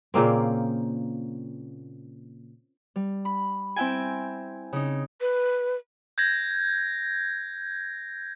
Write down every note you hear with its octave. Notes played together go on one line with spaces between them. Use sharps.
A#2 C#3 A#3 C4
G3
B5
C4 E4 E5 G5 G#5
C#3 D#4
B4
G6 G#6 A#6